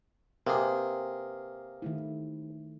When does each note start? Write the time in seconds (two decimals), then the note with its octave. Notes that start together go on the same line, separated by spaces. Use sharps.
0.47 C3 A#3 G#4 B4 C5
1.82 D#3 A3 E4